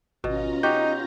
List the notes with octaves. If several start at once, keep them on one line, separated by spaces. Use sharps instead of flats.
G#1 B2 C#4 F4 A#5
D#4 F#4 G4 G6